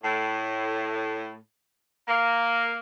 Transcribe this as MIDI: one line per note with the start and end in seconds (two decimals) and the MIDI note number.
0.03 1.36 45
2.08 2.78 58